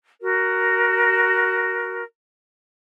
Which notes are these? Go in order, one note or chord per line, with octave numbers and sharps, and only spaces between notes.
F#4 A#4